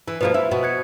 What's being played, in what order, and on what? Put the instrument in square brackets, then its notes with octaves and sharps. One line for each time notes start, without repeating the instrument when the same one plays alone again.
[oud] E3
[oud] B2 F3 A#3 [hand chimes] B4 C5
[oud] E4
B2 B3
[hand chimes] F#6 G#6 C#7